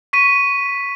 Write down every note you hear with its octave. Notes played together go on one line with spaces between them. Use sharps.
C#6 B6 D#7